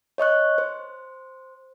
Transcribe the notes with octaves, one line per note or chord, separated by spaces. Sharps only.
C#5 D#5 C#6 F#6
C5